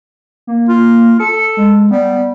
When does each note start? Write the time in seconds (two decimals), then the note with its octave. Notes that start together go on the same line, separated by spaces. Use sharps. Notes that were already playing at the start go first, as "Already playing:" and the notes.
0.47 A#3
0.69 F4
1.20 A4 C#7
1.57 G#3
1.91 G3 B3